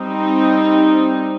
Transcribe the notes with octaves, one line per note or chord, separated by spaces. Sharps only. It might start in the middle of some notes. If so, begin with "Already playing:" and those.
Already playing: G3 C4 D#4